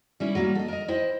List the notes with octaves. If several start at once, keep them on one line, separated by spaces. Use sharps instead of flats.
G3 C#4 E4
F#3 G3 A#3
A4 D#5
A#4 D#5
E4 C5 D#5 G5